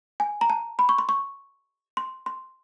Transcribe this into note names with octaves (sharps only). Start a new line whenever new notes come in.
G#5
A#5
A5
B5
C#6
C6
C#6
C6
C6